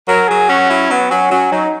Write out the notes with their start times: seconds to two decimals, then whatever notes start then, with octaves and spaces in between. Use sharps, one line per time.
0.08 F#3 A#4
0.28 F#3 G#4
0.49 C#4 F#4
0.70 F#3 E4
0.90 F#3 B3
1.11 F#3 C#4
1.31 F#3 C#4
1.52 F#3 D#4